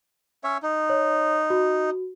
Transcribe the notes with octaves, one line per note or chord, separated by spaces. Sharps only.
C#4 C#5 E5
D#4
C#5
F#4